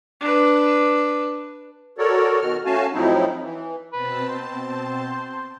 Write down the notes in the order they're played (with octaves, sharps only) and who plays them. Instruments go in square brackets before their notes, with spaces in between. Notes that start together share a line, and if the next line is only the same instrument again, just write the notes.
[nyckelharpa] D4 B4
[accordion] F#4 A4 A#4 C#5 D5
B2 D#3 F#4 F6
A3 C#4 F#4 F5 G#5 A5
A2 F3 F#3 C4 D#4 E4
E3
[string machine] B2 C4 A5 [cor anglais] B4
[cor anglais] C5